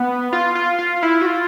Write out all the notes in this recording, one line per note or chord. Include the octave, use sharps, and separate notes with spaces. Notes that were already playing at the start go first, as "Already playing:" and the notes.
Already playing: B3
F4
F4
F4
E4
F#4
F4